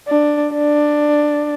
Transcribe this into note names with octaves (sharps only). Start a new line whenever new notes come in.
D4
D4